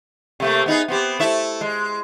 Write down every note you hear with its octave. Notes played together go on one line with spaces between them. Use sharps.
C3 A3 A#3
B3 D#4 G#4
B3 C4 G4
A3 E4 E5
G#3